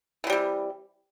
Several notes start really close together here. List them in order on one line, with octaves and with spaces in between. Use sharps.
E3 D#3 G3 C3